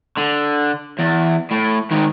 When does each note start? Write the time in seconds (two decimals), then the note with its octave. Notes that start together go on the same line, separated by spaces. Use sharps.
0.18 D3
0.99 E2
1.51 A2
1.91 G#2 D#3